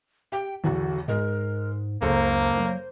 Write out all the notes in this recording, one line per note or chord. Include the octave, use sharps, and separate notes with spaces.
G4 G5
B1 E2 D3 F#4
G#2 G#3 A#4
F#1 C#2 A#3 A4 C5
F#3